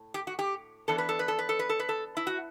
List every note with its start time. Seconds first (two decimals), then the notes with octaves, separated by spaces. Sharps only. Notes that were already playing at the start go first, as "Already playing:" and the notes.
Already playing: A2
0.14 G4
0.27 F#4
0.39 G4
0.88 E3 B3 D4 A4
0.98 B4
1.09 A4
1.19 B4
1.28 A4
1.39 B4
1.49 A4
1.59 B4
1.69 A4
1.80 B4
1.89 A4
2.17 E4
2.27 F#4